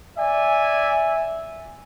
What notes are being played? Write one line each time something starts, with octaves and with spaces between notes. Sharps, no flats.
D5 E5 G#5